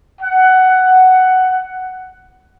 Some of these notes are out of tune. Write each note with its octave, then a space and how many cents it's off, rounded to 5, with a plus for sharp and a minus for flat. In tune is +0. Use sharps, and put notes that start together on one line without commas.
F#5 +10